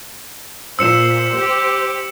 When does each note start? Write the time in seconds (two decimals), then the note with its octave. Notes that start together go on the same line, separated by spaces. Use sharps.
0.79 A#2 C5 E6 C#7 E7
1.36 G4